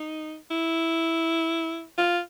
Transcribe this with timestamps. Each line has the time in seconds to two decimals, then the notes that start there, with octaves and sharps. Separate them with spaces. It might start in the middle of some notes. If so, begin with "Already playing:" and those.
Already playing: D#4
0.51 E4
1.98 F4